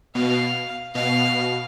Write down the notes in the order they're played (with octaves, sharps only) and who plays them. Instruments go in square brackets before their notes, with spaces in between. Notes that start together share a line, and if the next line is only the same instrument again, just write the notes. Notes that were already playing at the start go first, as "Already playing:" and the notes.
[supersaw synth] B2 [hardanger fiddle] F5
[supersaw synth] B2 [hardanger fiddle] F5